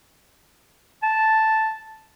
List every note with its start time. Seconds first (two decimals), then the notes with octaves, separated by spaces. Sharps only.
1.03 A5